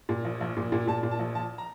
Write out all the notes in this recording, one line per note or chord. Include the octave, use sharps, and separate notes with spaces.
A#2
A#1
A#1
A#2
A#2
A#2 A5
A#2
A5
A#1
A#1 A5
A#5